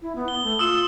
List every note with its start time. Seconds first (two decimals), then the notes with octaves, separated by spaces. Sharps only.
0.02 E4
0.16 B3
0.28 G7
0.43 A3
0.59 F4 D#6 E6 E7